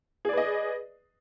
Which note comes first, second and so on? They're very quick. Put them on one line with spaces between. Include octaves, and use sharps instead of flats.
G#4 D5 B4 D#5